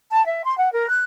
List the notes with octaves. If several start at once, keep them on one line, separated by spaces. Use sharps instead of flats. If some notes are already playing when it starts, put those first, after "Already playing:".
A5
E5
C6
F#5
A#4
F#6